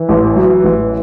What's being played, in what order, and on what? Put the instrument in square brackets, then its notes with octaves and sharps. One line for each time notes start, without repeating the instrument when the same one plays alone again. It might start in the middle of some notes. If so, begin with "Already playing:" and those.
Already playing: [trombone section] E3
[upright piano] A1
F#3
A1